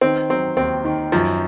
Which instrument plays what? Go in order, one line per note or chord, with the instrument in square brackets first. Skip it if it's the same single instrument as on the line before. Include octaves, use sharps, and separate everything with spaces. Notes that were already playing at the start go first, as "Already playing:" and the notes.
[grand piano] D#3 [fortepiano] C4
[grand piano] F#3 [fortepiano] C4
[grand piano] D#2 [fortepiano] C4
[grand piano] D#3
[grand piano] F#2 [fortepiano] F3